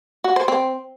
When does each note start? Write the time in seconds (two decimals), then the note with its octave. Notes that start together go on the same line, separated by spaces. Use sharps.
0.24 F#4
0.36 C5
0.48 C4